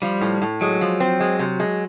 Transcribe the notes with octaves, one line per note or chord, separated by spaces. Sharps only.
F3 G3
A2
A2
F#3 G#3
F3
C4
G#3
C3
G#3